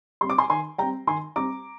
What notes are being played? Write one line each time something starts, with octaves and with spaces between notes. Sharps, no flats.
G3 C4 C6
D6
G#5 C6
D#3 G#5 C6
G3 C4 G5 A#5
D#3 G#5 C6
G3 C4 A#5 D6